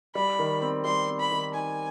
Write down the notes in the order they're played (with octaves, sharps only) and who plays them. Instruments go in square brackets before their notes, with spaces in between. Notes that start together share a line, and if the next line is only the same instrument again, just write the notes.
[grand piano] G3 [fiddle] B5
[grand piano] D#3
C4
[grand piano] G3 [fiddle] C6
[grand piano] C4
[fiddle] B5
[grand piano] D#3
[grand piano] D#4 [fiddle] G#5